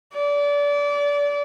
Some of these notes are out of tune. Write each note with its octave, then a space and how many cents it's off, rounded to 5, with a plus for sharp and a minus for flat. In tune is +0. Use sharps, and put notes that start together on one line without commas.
D5 -30